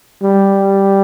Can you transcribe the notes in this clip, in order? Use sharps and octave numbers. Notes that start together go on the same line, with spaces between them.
G3